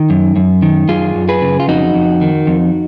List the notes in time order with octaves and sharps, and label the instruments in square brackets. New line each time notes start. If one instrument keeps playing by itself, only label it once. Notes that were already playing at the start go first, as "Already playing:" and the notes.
Already playing: [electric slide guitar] D#3
F#2
F#2
D#3
F#2 F4 G#4
F#2
G#4 B4
C#3
F4
F2 D#4 F#4
F2
D#3
F2